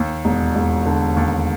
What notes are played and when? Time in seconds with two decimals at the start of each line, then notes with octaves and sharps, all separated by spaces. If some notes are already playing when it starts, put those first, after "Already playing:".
Already playing: D#2
0.25 E1
0.55 E1
0.86 D3
1.17 D#2